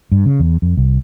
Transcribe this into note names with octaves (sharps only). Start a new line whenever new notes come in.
G2
C#3
E2
F2
C2